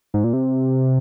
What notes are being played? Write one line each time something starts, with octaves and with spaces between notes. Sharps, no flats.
G#2
A#2
C3